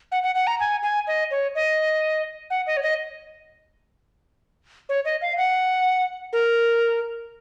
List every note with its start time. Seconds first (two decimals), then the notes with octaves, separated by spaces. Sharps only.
0.12 F#5
0.23 F#5
0.35 F#5
0.47 A#5
0.60 G#5
0.83 G#5
1.07 D#5
1.31 C#5
1.55 D#5
2.50 F#5
2.67 D#5
2.77 C#5
2.83 D#5
4.89 C#5
5.05 D#5
5.22 F5
5.37 F#5
6.33 A#4